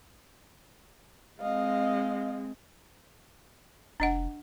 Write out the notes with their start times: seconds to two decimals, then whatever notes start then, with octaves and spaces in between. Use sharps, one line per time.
1.41 G#3 C4 D#5 F5
4.00 F1 D4 D#5 F#5